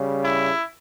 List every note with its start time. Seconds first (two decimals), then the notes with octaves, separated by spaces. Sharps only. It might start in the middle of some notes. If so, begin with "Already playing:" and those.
Already playing: C#3 G3
0.25 E4